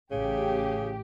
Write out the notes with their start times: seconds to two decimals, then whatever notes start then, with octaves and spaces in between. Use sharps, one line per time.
0.11 A1 C#3 G4